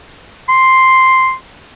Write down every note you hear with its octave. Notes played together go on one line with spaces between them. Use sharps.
C6